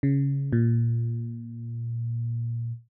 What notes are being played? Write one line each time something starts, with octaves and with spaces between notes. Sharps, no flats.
C#3
A#2